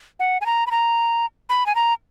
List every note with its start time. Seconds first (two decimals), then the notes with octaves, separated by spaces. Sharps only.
0.20 F#5
0.41 G#5
0.46 A#5
0.67 B5
0.71 A#5
1.49 B5
1.66 G#5
1.75 A#5